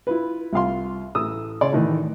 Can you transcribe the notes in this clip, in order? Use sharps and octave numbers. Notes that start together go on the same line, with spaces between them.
E4 F4 B4
C2 F4 F5 C6
A1 D#6 E6
C#3 C#5 D5 C6
A2 D#3 E3